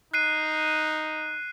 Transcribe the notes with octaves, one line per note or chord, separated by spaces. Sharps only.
D#4 F#6 C7 D#7